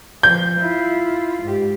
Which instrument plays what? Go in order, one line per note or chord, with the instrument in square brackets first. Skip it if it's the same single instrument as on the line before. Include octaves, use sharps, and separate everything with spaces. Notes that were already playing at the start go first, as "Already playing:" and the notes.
[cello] F3 [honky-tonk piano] G6
[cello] E4 F4
G#2 G4